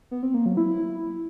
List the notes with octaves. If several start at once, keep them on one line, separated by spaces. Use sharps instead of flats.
B3
C4
A#3
F#3
E4